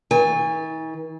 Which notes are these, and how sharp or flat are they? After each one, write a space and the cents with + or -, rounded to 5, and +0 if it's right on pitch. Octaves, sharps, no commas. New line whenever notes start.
D#3 +45 G#5 -30